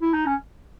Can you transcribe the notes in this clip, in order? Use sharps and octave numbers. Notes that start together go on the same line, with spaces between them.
E4
D#4
C#4